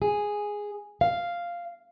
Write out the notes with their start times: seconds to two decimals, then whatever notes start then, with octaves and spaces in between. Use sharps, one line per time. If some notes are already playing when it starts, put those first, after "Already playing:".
0.02 G#4
1.01 F5